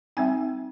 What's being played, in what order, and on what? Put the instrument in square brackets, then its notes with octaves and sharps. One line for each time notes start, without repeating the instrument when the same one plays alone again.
[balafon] G3 C4 D#4 G#5